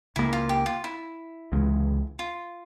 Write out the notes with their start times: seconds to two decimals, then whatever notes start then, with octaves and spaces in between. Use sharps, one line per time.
0.16 C#2 C#3 E3 A#3 E4
0.33 F4
0.49 G4
0.66 F4
0.84 E4
1.52 C#2 C3 E3 G#3
2.19 F4